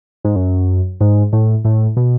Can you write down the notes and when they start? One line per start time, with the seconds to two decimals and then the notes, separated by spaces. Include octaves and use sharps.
0.24 G#2
0.36 F#2
1.01 G#2
1.33 A2
1.65 A2
1.97 B2